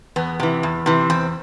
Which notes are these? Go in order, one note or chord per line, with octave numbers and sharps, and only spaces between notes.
E2 B3
C3 E3
E2
C3 E3
E2 C4